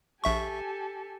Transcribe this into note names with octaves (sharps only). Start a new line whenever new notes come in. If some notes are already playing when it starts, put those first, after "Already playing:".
A#1 G4 A4 E5 G#5 C#6